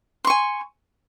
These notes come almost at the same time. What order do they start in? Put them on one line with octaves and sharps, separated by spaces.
C6 C#6 G#5